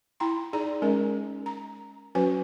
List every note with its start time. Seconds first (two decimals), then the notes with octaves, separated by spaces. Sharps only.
0.20 E4 G5 A#5 C6
0.53 D#4 G#4 D5 A#5
0.82 G#3 C#4 A#4
1.46 A#5
2.15 F#3 C#4 F#4 B4 G#5